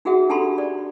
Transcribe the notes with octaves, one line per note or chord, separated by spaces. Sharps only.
D#4 F#4 G#4 A#4 E5 F#5
D4 G4 A4 A5 B5 C6
D5